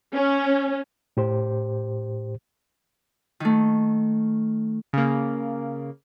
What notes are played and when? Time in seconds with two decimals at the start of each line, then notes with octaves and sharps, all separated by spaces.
0.14 C#4
1.17 A2 G4 C5
3.40 D#3 A3
4.93 C#3 A#3